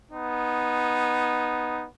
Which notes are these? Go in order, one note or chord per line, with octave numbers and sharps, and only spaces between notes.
B3 D#4